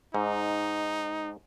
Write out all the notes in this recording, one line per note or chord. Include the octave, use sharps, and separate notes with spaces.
G#2 D#4